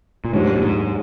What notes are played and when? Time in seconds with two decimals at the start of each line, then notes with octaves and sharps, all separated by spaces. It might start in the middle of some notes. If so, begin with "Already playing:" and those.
0.25 A#2
0.33 F1 D#2 G#2 D#3 F#3 D4
0.56 A#2
0.62 G#2